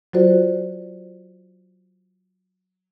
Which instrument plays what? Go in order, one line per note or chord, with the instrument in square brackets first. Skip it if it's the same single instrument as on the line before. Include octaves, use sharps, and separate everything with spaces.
[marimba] F#3 F4 F#4 C5 D5